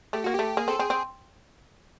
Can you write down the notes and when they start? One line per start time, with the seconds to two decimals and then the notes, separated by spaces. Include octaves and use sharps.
0.13 A3 G4
0.24 A#3 F#4
0.34 G4
0.39 A3
0.57 A#3 G#4
0.68 C4 A4
0.79 C4 G#4
0.90 C4